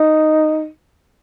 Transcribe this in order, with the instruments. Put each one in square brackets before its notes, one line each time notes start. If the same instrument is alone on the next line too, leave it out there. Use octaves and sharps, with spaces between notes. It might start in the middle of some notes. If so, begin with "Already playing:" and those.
Already playing: [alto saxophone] D#4